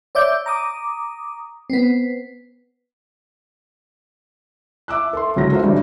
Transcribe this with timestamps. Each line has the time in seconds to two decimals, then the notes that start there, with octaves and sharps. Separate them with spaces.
0.15 C#5 D5 E5 D6 G6
0.46 A#5 D6 D#6
1.70 B3 C4
4.88 E5 D6 E6 F#6
5.13 A4 E5 C6
5.36 G1 C#2 F#3 E4 F4 A#6
5.51 F3 A3 F4 F#4 C5 E5
5.64 A1 D3 F#3 G3